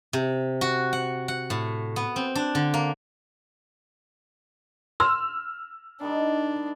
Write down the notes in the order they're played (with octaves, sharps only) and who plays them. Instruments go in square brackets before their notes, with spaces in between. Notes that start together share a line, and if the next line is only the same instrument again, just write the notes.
[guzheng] C3
F#4
F#5
F#5
A2
B3
C4
D4
D3
A#3
[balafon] C6 [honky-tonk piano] E6 F6
[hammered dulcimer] D#3 G3 D#4 [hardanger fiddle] D4